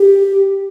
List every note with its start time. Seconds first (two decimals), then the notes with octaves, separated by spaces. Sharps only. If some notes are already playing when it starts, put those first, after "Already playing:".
Already playing: G4